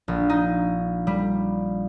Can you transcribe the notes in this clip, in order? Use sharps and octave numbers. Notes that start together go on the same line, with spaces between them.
A#1
D#4
G3